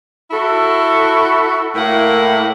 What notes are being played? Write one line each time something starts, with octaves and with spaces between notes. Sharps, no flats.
E4 F#4 A4
A2 A#3 E4 A#4 F#5